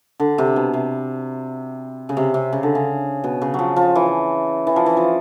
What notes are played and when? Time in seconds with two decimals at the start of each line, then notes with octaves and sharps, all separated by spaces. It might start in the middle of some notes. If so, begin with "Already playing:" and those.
0.20 D3
0.38 C3
0.56 B2
0.74 C3
2.09 C#3
2.17 C3
2.34 C3
2.53 C#3
2.63 D3
2.75 C#3
3.24 B2
3.42 C#3
3.54 F3 F#3
3.76 F3
3.95 E3
4.67 E3
4.76 F3
4.86 E3
4.97 F3